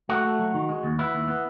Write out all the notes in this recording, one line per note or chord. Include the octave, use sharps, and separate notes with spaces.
A3 F#4
A3
F#3
D#3
G#3
D#2
B3 E4
D#2
B3